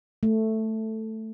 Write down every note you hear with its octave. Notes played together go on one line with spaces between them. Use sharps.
A3